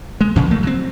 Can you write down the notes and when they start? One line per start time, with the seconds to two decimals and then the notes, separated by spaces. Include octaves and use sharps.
0.21 G#3
0.36 A#2 C#3 F3
0.51 F#3 A3 A#3
0.63 F#3 C4